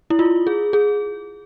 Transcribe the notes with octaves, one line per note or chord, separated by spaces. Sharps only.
E4
F4
G#4
G#4